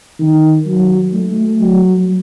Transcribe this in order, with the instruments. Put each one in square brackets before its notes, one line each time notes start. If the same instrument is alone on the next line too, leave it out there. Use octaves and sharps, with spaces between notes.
[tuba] D#3
F#3
A3
F#3